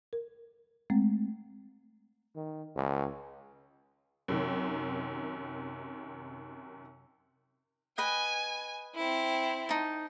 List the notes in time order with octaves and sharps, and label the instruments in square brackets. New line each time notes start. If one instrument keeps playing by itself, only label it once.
[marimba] A#4
G#3 A3 C4
[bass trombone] D#3
C#2
[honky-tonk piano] F#2 C3 D#3
[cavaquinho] B4 D#5 G5 [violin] G#5
[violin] C4 E4
[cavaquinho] D#4 A5